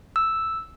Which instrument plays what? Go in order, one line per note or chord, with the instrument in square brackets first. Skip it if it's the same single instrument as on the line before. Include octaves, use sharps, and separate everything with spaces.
[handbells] E6